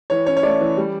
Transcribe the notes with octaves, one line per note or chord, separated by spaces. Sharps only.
E3 C#5
C#4 C#5
C#5
A3 D5
E3
G3